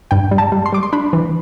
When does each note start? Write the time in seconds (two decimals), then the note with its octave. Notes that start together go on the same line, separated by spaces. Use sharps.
0.11 G2 G5
0.31 G3
0.38 A5
0.52 G3
0.66 C6
0.72 G3 D6
0.83 C6
0.93 D4 B5
1.13 E3